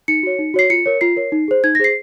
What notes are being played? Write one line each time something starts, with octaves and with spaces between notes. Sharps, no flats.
D#4 C#7
F#4 C#5
D#4
F#4 C#5 C7
F4 C#7
A#4 C#5
F4 C7
A#4 C#5
D#4
G#4 C5
D#4 G#6
A#6
G#4 C5 C7